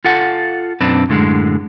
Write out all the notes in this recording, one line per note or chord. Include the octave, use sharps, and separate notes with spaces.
F4 A4 F#5
B1 F#2 C4 D4 B4
F#2 A2 D3 G#3